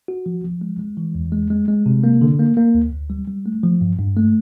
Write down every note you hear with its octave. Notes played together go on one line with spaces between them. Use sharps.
F#4
F3
F3
G#3
G#3
E3
E2
G#3
G#3
G#3
C3
A#3
D3
A#3
A#3
D2
D2
G3
G3
A3
F3
G2
G2
A3